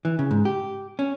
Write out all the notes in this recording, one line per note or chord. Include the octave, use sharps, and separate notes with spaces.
E3
C#3
G#2
G4
C#4